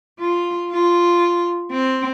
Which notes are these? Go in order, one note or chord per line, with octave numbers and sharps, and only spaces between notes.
F4
F4
C4